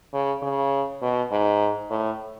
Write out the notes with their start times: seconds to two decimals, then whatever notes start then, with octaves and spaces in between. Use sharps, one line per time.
0.13 C#3
0.42 C#3
1.02 B2
1.31 G#2
1.90 A2